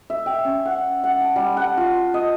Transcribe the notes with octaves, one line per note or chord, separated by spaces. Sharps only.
E5
G5
C#4
F#5
F#5
A5
G3
F#5
F4
D#5